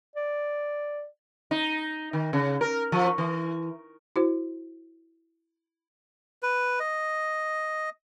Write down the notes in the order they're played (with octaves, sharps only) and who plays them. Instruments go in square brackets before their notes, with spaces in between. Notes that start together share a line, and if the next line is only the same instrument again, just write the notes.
[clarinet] D5
[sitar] D#4
D#3
C#3
A#4
F3
E3
[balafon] E4 F#4 C5
[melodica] B4
D#5